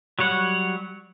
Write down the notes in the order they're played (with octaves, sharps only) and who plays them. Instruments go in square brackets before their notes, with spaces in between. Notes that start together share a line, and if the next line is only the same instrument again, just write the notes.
[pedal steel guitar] F#3 G3 C#5 F#5